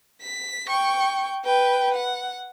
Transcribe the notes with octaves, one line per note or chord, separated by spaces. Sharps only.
B6
G5 C#6
B4 G5
F#5